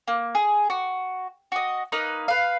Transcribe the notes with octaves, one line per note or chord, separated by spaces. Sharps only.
A#3
G#4
F#4
F#4 D#5
A#3 D#4 B4
B4 F5